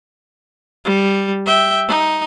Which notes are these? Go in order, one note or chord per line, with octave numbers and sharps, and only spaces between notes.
G3
E5 G5
D#4